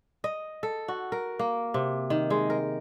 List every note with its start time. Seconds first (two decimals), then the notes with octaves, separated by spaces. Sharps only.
0.24 D#5
0.63 A4
0.88 F#4
1.12 A#4
1.39 A#3
1.74 C3
2.10 D#3
2.30 G#3
2.50 A#4